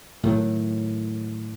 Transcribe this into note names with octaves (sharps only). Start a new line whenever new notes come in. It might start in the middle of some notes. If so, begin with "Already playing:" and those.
A2 D#3 F#3